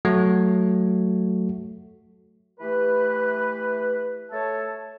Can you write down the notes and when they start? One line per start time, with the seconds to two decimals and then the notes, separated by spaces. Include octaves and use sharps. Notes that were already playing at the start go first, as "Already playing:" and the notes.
0.05 F#3 A3 F#4
2.60 E3 A3 G4 B4
4.31 A3 A4 C#5 E5 A5